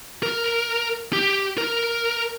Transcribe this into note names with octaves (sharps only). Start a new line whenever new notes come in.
A#4
G4
A#4